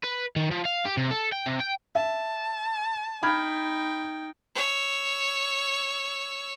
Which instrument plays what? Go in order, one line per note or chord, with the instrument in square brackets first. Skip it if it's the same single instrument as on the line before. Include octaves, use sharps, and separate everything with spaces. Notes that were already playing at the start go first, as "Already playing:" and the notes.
[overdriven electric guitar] B4
D#3
F3
F5
G4
C3
A4
G5
C3
G5
[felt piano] E5 [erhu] A5
[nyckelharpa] D#4 G5 [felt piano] B5 F6 G#6
[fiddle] C#5 E6